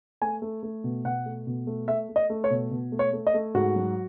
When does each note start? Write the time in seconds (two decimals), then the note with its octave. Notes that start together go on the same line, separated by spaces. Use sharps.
0.21 A3 G#5
0.42 A3
0.63 A3
0.84 B2
1.05 B2 F#5
1.26 A3
1.47 B2
1.67 A3
1.88 A3 E5
2.09 A3
2.16 D#5
2.30 A3
2.44 C#5
2.50 B2
2.71 B2
2.92 A3
2.99 C#5
3.13 A3
3.27 D#5
3.34 A3
3.54 G#2 F#4
3.76 F#3